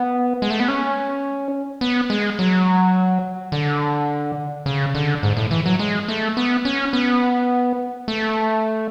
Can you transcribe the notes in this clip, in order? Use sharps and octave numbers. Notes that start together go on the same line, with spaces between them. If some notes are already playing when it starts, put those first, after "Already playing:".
Already playing: B3
G#3
A3
B3
C#4
B3
G#3
F#3
D3
C#3
D3
G#2
A2
E3
F#3
G#3
A3
B3
C#4
B3
A3